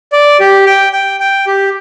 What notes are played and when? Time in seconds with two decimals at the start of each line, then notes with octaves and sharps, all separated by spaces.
0.12 D5
0.40 G4
0.66 G5
0.93 G5
1.20 G5
1.47 G4